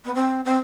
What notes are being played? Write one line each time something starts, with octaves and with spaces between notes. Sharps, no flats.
B3
C4
C4